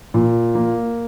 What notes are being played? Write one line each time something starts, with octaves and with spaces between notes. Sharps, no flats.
A#2
A#3